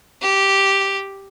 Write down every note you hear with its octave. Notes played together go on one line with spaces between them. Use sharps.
G4